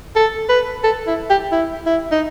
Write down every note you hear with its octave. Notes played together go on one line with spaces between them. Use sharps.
A4
B4
A4
E4
G4
E4
E4
D#4